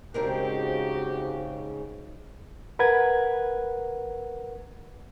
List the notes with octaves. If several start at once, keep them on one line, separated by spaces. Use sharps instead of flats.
G#2 C#3 C4 D4 D#4 F#4 G4 A#4
A#4 B4 F#5 G#6